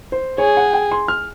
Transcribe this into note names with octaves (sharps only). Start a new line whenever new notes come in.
C5
G#4 C#5
F#5
G5
C6
F6